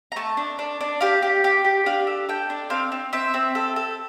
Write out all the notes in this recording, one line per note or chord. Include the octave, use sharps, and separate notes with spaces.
A#5
A3 A5
D4
D4
D4
G4 F5
G4
G4
G4
D4 F5
A4
A4 G5
D4
C4 F5
C4
C4 E5
C4
A4
A4